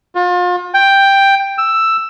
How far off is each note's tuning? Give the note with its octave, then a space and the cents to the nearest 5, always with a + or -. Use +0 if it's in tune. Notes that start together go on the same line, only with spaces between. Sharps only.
F4 +35
G5 +5
E6 +5